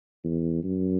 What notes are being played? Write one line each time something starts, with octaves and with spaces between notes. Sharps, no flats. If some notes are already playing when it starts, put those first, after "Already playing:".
E2
F#2